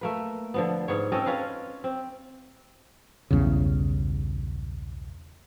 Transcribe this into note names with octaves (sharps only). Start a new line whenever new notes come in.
A3 A#3 B4
D3 F3 B3
G#2 B3 C#5
C4 C#4 A4 D#5
C#4 F4 B4 F5
C4
B1 E2 G2 C#3